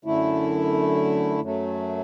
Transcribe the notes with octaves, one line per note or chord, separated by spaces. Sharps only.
F#2 D3 A3 E4
F#2 F#3 A3